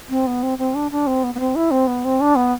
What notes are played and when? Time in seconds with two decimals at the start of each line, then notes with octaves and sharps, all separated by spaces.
0.09 C4
0.27 B3
0.43 C4
0.58 C4
0.75 D4
0.91 D4
1.07 C4
1.23 B3
1.35 B3
1.40 C4
1.55 E4
1.71 C4
1.87 B3
2.04 C4
2.21 D4
2.36 B3